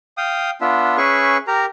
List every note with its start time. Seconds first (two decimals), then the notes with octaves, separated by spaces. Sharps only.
0.18 F5 G5 D#6
0.61 B3 D4 F4 E5
0.97 C#4 G#4 B4 E5 C#6
1.47 G4 A#4 A#5